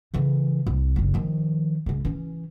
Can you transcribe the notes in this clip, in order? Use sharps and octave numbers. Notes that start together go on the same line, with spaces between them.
C#3 E3
C2
F#1 C#3
D#3 F3
C#2 C#3
E3 C#4